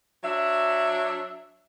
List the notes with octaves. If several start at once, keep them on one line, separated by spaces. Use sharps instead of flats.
F#3 D4 E5